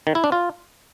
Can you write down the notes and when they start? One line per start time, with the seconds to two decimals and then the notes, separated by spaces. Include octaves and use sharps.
0.07 D#3
0.15 E4
0.24 D4
0.32 F4